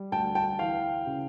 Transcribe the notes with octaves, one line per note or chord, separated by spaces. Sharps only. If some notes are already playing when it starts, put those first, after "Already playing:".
Already playing: G3
D2 G5 A5
G5 A5
E3 F5 G5
C#3